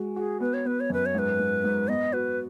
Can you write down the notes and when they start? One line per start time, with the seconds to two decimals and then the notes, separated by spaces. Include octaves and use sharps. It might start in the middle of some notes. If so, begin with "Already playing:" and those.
Already playing: G#3 F#4
0.16 F#4 G#4
0.40 B3 B4
0.54 C#5
0.65 B3 B4
0.80 C#5
0.90 F#2 B4
1.06 C#5
1.14 G#2 B4
1.39 G#2
1.64 G#2
1.88 B3 D#5
2.13 F#4 B4